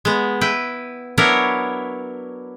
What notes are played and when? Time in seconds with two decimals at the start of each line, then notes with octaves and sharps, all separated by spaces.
0.05 G#3 B3
0.41 E4 B4 G5
1.18 F#3 B3 D4 E4 A#4 C#5